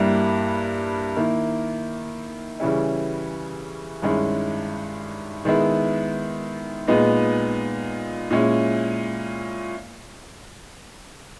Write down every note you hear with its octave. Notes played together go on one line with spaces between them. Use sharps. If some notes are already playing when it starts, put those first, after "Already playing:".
Already playing: G2 G3 A#3 E4
D#3 A#3 E4
C#3 E3 G3 C#4 E4
G2 D#3 G#3 C#4 E4
D#3 G#3 B3 E4
A#2 G#3 B3 D#4
A#2 G#3 C#4 E4